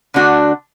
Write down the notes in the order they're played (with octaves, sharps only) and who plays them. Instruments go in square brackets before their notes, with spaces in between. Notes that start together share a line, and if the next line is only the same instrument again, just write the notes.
[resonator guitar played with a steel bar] D3 A3 D4 F#4